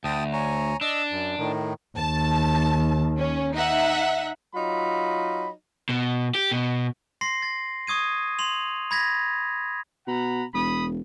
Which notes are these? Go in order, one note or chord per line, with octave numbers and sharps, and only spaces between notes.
D2 G5 A5 D#6
C#5 G#5 A#5
D4 D#5 E6
F#2
A2 D#3
D#2 A5
C#4
D#4 E5 F#5
F#3 D#4 F4 B5
B2
G4
B2
C6 A#6 C7
A6
C#6 D#6 G#6 D#7
C6 F7
B5 G#6 A#6 B6
B2 F#5 A#5 B5
E1 B5 D#6